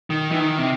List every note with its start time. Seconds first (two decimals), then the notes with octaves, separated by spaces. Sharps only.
0.10 D#3
0.32 E3
0.40 D#3
0.58 C3